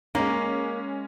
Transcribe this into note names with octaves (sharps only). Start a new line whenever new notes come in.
G#3 A#3 C#4